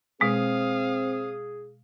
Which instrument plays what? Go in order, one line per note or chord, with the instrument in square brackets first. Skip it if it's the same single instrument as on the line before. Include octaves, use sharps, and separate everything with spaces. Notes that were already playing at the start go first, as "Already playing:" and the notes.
[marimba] B2 G#3 [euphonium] C4 [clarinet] G#4 [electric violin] F5 D#6